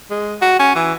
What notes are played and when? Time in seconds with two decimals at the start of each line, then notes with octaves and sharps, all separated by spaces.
0.10 G#3
0.41 F#4
0.59 C#4
0.75 E3